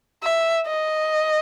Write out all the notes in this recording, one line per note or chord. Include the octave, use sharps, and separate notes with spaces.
E5
D#5